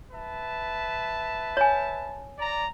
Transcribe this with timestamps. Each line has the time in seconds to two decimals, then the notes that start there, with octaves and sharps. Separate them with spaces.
0.11 B4 E5 A5
1.57 C#5 G#5
2.38 D5 A#5